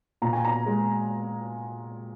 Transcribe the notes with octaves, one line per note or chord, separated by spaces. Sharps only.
A#2 A#5
G#5
A#5
G#3